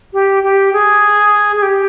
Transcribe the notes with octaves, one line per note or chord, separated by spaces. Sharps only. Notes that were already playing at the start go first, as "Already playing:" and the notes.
G4
G4
G#4
G#4
G4